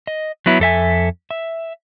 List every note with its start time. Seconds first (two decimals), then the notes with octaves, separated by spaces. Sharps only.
0.07 D#5
0.46 F#3 B3 E4
0.60 F2 A4 E5 G#5
1.31 E5